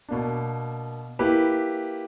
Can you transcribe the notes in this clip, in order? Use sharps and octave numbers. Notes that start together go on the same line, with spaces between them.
B2 A#3 D4
A#3 E4 G4 B4